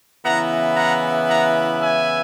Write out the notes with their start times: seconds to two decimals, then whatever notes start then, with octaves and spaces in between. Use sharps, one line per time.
0.24 C#3 E3 B3 E4 F#5 A#5
0.76 F#5 A#5
1.28 F#5 A#5
1.80 E5 G#5